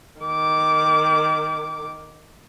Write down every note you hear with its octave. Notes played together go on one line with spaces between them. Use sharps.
D#3 D6